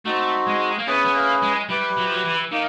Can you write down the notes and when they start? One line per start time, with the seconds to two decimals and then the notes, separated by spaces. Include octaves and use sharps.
0.05 A3 C4 D#4 F#4
0.47 G#3
0.78 A#3
0.87 B3 C#4 E4 G#4 B4
1.05 B3
1.14 A#3
1.42 G#3
1.69 G3 E4 G4 B4
1.97 F#3
2.05 F3
2.13 F#3
2.24 E3
2.51 D#3 A#3 D#4